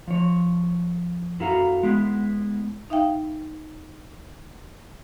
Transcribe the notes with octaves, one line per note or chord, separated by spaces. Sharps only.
F3 C#5
F#2 E4 F#4 A4 F5 A#5
G#3 B3 E4
D#4 E5 F5 G5